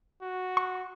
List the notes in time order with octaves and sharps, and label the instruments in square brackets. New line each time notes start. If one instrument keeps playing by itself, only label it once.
[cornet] F#4
[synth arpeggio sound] C#6